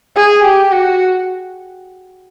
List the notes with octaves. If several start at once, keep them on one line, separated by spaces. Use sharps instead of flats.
G#4
G4
F#4